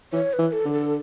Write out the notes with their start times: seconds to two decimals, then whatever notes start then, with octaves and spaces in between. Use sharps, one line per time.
0.13 E3 C#5
0.33 B4
0.39 E3
0.52 A4
0.66 D3
0.72 A4